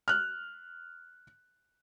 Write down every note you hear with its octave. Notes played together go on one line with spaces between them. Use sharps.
F6 F#6